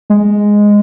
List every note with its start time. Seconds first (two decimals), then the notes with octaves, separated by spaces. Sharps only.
0.10 G#3